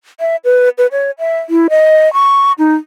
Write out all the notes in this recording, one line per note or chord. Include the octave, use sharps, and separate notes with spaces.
E5
B4
B4
C#5
E5
E4
D#5
C#6
D#4